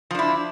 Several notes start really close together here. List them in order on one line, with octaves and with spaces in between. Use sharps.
F3 D4 E4